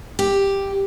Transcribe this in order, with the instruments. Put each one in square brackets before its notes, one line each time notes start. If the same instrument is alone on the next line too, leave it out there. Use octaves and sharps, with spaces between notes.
[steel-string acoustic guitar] G4